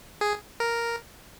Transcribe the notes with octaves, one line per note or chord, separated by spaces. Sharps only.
G#4
A#4